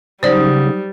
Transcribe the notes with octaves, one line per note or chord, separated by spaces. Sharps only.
C#3 F#3 G3 D#4 C5 D5 D#6